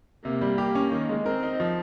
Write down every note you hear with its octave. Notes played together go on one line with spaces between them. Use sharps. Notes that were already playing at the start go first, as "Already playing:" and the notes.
C3 A#3
G3
G4
C#4
D#3
G#3
C4 A#4
D#4
F3